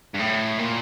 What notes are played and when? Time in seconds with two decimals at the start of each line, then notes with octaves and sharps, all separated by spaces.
0.15 G2
0.20 A2
0.59 A#2